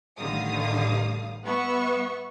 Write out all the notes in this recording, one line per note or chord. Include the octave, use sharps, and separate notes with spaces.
A1 D3 D#3 G3 F5 D#6
G3 B3 B4 E5 F#5 C#6